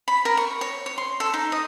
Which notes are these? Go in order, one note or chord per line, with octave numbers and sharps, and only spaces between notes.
B5
A#4
C#6
C#5
C#5
C6
A4
D#4
D#5